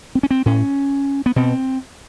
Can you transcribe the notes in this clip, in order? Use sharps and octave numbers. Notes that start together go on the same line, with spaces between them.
C4
C#4
C4
A2 C#4
B3
B2 C4